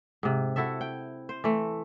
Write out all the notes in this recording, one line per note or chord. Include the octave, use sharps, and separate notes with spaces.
G#2 C3
E4 F#4 A4 E5
G5
C5
E3 A3